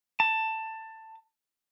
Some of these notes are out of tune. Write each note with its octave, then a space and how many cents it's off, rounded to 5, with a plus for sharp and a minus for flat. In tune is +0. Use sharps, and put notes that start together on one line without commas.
A5 +15